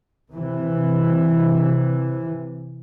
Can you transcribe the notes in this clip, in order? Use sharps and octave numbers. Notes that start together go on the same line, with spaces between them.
C3 E3